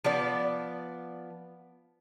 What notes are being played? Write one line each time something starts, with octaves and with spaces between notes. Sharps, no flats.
F3 B3 D5